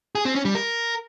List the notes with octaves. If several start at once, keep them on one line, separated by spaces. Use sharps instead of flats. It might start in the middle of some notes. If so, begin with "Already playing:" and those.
G#4
C4
C#4
G3
A#4